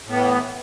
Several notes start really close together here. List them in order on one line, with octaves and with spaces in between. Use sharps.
A2 B3 E3